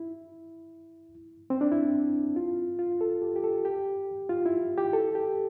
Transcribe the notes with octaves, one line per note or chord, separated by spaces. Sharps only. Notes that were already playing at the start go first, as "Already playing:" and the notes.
Already playing: E4
C4
D4
E4
F4
F4
A4
G4
G4
A4
G4
F4
E4
G4
A4
G4